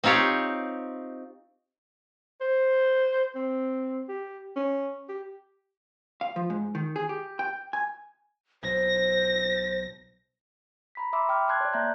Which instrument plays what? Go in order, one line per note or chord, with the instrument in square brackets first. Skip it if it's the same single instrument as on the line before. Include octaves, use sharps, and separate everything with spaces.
[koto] C4 D#4 F4 G4 C#5
[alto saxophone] C5
C4
G4
C#4
G4
[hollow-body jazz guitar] F5
F3
G#2
D#3
G#4
G4
G5
G#5
[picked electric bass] B1 [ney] C5 [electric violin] A#6
[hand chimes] A#5 B5 B6
E5 B5 C6 D6 E6
G5 D6 F6
A5 C6 F#6 G#6
C#5 D5
A#3 E5 A#5 F#6 G6